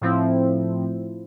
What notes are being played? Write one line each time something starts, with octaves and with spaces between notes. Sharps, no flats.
A2 F3 C4 E4